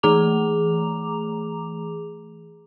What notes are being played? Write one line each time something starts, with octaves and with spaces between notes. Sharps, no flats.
E3 A3 G#4 A#5 D6 F7